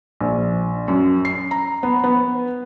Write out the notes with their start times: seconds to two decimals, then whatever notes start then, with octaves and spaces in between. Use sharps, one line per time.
0.21 A#1
0.88 F#2
1.25 C7
1.51 A#5
1.83 B3
2.04 B3